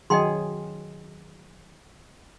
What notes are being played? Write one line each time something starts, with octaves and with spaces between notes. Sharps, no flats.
D#3 F#3 G#4 D#5 G5 C6